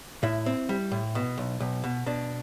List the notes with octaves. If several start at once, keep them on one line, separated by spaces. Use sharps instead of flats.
A2 E4
C4
G3
A2
B2
B1
B1
B2
B2 D4